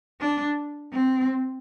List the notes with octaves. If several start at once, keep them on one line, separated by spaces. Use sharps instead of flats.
D4
C4